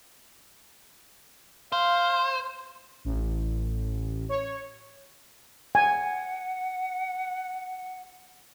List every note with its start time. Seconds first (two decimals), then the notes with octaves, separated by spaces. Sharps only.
1.72 C5 F5
3.05 A1
4.29 C#5
5.75 F#5 G#5